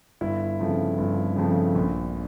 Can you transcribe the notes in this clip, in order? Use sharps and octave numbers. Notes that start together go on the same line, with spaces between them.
G1 E4
F2 C#3 F3 A3
G1
F2 C#3 F3 A3
A#1